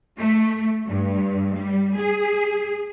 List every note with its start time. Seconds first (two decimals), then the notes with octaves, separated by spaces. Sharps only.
0.17 A3
0.88 G2
1.55 G3
1.97 G#4